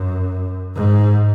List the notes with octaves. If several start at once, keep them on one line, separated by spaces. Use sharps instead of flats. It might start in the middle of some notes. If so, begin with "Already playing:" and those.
Already playing: F#2
G#2